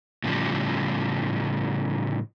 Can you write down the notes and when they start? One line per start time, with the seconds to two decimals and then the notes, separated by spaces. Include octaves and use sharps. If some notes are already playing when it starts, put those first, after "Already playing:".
0.24 A2 C#3 F3 G3